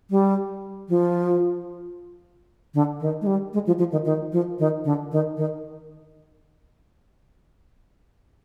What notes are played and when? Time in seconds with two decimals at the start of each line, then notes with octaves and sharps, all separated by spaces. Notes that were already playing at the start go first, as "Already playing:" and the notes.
0.10 G3
0.89 F3
2.74 D3
3.00 D#3
3.22 G#3
3.27 G3
3.53 G#3
3.67 F3
3.79 F3
3.92 D#3
4.05 D#3
4.32 F3
4.59 D#3
4.85 D3
5.12 D#3
5.37 D#3